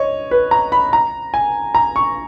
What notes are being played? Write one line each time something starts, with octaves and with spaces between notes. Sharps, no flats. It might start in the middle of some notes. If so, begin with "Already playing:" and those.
Already playing: C#5 D#5
B4
A#5
B5
A#5
G#5
A#5
C#6